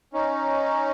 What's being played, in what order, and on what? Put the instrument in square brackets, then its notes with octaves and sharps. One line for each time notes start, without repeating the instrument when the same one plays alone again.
[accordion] C#4 D#4